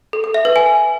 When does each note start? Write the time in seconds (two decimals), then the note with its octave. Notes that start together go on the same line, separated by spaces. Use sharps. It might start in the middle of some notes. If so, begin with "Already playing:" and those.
0.13 A4
0.24 A4
0.34 E5
0.45 B4
0.56 G#5